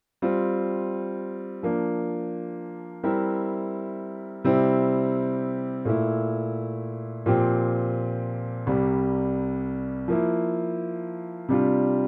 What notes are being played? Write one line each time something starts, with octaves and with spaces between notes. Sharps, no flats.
G3 C4 F4
F3 A#3 D4
G3 C4 E4 A#4 E5
C3 G3 C4 E4
A#2 A3 E4
A#2 F3 C4 G4
C2 C3 G3
F3 A#3 E4
C3 G3 D4 F4